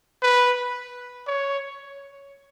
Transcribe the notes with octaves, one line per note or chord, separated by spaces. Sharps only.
B4
C#5